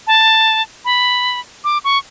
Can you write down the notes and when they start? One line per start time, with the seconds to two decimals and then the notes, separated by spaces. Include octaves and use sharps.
0.07 A5
0.85 B5
1.64 D6
1.84 C#6